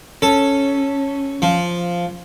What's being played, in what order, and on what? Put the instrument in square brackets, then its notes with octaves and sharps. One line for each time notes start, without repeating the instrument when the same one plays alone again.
[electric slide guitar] C#4 [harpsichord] A4
[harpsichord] F3